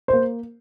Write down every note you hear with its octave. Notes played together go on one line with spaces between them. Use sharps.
A#3 C5